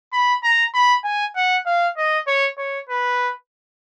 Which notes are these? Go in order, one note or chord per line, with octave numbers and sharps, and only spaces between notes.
B5
A#5
B5
G#5
F#5
F5
D#5
C#5
C#5
B4